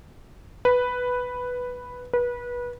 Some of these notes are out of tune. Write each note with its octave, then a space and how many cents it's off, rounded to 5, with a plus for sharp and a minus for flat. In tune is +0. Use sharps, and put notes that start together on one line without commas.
B4 +0
B4 -25